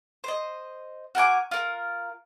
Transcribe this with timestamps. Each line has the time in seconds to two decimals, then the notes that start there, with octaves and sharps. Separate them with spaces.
0.24 C5 D#5
1.15 F#4 A#4 G#5 D6
1.51 F4 A#4